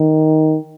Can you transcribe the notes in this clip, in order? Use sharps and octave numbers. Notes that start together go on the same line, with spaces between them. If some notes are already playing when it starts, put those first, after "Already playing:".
Already playing: D#3